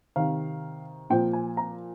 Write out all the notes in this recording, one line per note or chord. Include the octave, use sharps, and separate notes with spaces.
C3 D#3 F5
A#2 F3 G5
G#5
A#5